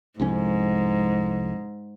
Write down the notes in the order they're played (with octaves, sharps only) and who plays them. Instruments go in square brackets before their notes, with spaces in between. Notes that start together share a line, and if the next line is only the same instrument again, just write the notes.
[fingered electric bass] C2 F2 C#4 [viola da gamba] G#2